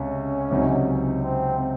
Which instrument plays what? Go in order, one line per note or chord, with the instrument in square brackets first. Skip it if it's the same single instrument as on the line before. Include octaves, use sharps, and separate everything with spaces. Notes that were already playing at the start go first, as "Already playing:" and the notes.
Already playing: [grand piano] C#2 C3 [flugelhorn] C#4
[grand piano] C#2 C3 F#3 C4 D#4
[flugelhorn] C4